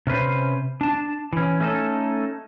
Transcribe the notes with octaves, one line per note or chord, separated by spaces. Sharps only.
C3 C#4 B4 C5
D4 A5
E3 C#4
A3 C#4 D#4 G#4 A4